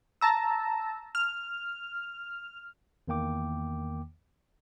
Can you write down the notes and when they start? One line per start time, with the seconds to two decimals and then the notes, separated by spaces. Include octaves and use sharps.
0.21 A5 A#5 E6
1.15 F6
3.08 E2 D#3 A#3 G5 D6